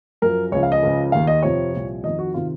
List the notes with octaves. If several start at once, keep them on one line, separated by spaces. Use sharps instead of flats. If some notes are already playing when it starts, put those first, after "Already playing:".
F#2 F3 A#4
C#2 C#3 F3 C#5
F5
D#5
C#2 C#3 F3
D#2 D#3 F5
D#5
F2 C3 F3 C#5
C2 A#2 F3
F2 D#3 D#5
F#4
C3 D#3 F4